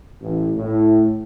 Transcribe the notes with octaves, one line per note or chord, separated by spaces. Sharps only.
A1
A2